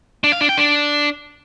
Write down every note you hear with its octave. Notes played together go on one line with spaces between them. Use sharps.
D4
F5
D4
G5
D4